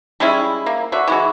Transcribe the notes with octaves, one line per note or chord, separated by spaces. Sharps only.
G3 G#3 C#4 E4
A#3
D3 F#4 E5
E3 G#3 F#4